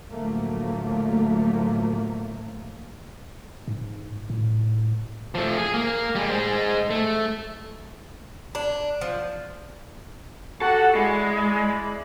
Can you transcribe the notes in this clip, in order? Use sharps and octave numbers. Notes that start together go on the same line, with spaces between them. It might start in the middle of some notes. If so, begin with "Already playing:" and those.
A2 D3 F3 F#3 A3 A#3
G#2
A2
F3 A3
G#4
A#3
G3 G#3
G#3 C5
A3
D4
F3
F#4 G4 A4 F#5
G#3 E4 D5 B5